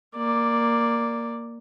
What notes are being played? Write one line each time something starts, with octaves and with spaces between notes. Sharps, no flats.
A#3 D5